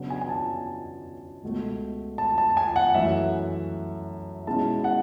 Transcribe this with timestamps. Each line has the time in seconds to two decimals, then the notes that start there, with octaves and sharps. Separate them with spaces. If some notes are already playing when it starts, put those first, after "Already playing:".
Already playing: C#3 F#3 B3 D4
0.10 G#5
0.21 G#5
0.29 A5
1.43 C#2 B2 A3
2.18 A5
2.38 A5
2.57 G#5
2.76 F#5
2.94 F#2 E3 A3 E5
4.47 B2 G#3 C#4 E4 A5
4.84 F#5